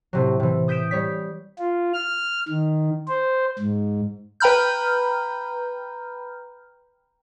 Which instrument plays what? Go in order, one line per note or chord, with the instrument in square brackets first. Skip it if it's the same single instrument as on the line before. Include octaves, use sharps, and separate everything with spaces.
[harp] A2 C3 F#3
C3 E3
D#6 G6 B6 D7 E7
G3 C#5 B6
[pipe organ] F4
F6
D#3
C5
G#2
[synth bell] B4 G5 A#5 B5 F6 G6